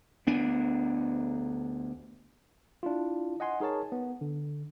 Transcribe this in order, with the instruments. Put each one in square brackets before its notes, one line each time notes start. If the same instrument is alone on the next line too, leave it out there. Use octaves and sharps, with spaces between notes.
[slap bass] D2 B3 D4
[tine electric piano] D4 E4 F4
D#5 F#5 G#5 C6
D#4 G#4 A#4 C#5 A5
B3
D3